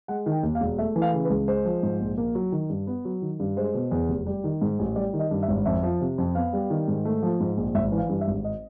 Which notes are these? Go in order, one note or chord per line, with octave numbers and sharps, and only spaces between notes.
G#3 F#5
D#3
G5
D#2
F5
E1
A3 E5
E3
F5
C#3
B4
C#2
G#3 C5
F3
G#2
A#1
A#3
F#3
D#3
G2
B3
F#3
D#3
G2
G#3 C5
B2
E2
F1
G3
D#3
G#2
A1
G3 D5
D#3
D#5
G2
E5
G#1
F2 E5
F3
C3
F2
B3 F5
G3
D#3
G#2
A3
F3
G#2
A#1
G#1 E5
E3
F5
G2
E5
G#1
D#5